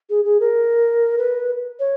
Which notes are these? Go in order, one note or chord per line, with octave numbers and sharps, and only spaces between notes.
G#4
G#4
A#4
B4
C#5